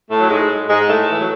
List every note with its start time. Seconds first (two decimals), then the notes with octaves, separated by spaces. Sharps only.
0.09 A2 A3
0.20 F#3
0.29 G#2 G#3
0.68 G#2 G#3
0.88 A2 A3
1.11 E3
1.20 F#3